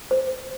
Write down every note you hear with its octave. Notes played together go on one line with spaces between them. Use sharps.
C5